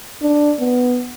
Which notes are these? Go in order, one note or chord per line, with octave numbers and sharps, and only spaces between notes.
D4
B3